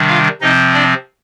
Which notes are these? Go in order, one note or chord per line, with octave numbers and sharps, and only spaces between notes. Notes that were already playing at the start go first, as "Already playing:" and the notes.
Already playing: C3 D#3 G3 D4
F4 F5
C3 F3 C4 D#4 D#5
D4 D5